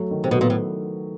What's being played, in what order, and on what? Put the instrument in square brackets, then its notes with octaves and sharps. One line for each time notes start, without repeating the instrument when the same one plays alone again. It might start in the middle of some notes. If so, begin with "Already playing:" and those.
Already playing: [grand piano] F#3 A3
D#3
[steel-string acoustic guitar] C3
[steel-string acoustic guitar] B2 [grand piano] F#3 A3
[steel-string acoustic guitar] A#2
A2